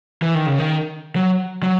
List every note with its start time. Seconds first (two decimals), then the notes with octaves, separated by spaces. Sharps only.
0.22 E3
0.35 D#3
0.46 C#3
0.58 D#3
1.16 F#3
1.63 F#3